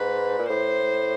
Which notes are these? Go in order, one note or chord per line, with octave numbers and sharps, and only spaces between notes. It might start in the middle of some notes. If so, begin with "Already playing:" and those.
Already playing: G#2 B4
A#2
A2 C5